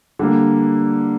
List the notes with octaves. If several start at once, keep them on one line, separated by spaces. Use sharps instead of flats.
D3 G3 A#3